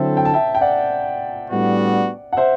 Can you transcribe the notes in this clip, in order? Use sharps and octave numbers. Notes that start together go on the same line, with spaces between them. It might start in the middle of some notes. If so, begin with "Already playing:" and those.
Already playing: D3 F#3 C4 E4 A4 C5 E5
G5
A5
E5 G5
G5
D5 F#5
A2 G3 B3 D4 F#4
F#5
C5 E5